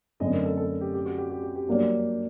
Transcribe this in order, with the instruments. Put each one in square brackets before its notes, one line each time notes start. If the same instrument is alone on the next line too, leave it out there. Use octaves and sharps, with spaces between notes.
[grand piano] F#2 D3 A3 C4 [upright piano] D#5
[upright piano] A#4
A4
A4
G4
G4
F#4
G4
G4
G4
G4
[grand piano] G2 F#3 A#3 D4